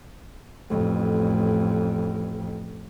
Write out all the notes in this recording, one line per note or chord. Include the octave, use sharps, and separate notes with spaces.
A1 F2